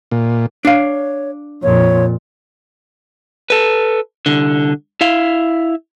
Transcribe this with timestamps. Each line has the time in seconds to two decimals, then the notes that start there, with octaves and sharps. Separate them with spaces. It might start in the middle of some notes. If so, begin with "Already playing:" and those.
0.11 A#2
0.65 D4 C#5 F5
1.63 F2 A#2 C#5
3.50 A4 B4
4.26 C2 D3
5.01 E4 F5